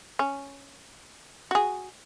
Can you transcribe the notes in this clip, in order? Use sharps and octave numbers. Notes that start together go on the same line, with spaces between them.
C#4
F#4 G#4